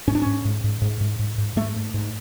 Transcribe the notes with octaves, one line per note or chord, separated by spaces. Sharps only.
G#2 C#4
D4
G#2 C#4
G#2
G#2
G#2
G#2
G#2
G#2
G#2 A3
G#2
G#2